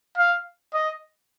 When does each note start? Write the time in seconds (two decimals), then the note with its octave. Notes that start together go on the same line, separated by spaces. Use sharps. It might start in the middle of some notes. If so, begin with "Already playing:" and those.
0.18 F5
0.74 D#5